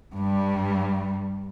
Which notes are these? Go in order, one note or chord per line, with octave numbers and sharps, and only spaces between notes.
G2 G3